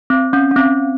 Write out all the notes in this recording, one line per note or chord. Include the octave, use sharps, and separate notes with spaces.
C4
C#4
C#4
C4